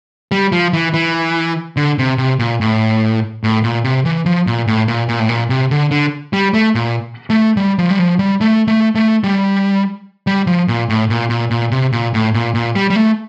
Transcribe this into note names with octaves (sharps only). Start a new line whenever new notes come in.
G3
F3
E3
E3
D3
C3
C3
A#2
A2
A2
A#2
C3
E3
F3
A#2
A2
A#2
A#2
A2
A#2
C3
D3
D3
G3
A3
A#2
A3
G3
F3
G3
F3
G3
A3
A3
A3
G3
G3
F3
A#2
A2
A#2
A#2
A#2
C3
A#2
A2
A#2
A#2
G3
G3
A3